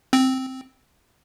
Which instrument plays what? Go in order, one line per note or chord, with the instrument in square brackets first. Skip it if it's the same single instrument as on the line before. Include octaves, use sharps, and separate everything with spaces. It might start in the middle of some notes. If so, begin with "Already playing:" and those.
[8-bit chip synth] C4